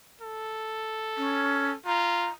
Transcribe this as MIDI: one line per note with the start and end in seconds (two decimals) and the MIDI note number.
0.22 1.76 69
1.17 1.71 61
1.86 2.29 65
1.86 2.30 82